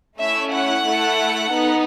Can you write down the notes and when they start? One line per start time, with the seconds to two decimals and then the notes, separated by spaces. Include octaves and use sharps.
0.20 A3 C#4 E4 E5
0.54 F#5
0.87 A3 E4 A4
1.53 B3 D#4